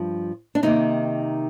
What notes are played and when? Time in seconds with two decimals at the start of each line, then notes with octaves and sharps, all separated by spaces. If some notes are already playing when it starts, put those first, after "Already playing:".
Already playing: G2 F3
0.55 D4
0.63 C3 D#3 A#3 D#4